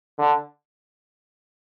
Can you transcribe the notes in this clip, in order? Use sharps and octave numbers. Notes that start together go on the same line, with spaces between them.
D3